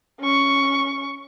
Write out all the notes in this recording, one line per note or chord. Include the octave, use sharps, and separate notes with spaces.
C#4 C#6